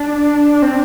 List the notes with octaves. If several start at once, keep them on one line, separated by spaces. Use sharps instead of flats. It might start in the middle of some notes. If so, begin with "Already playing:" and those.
Already playing: D4
C4